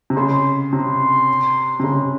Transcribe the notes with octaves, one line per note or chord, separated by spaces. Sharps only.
C3
C#3 C6
C3 C6
C3
C#3